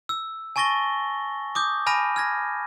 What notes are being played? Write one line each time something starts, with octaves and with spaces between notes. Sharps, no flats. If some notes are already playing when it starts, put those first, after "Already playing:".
E6
G#5 A5 C#6 A6 A#6 G7
D6 D#6 G6
G#5 A5 B5 F6 A#6 D#7
F6 G#6 A#6